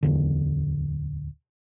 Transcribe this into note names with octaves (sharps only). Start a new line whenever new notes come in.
D1 E2 D3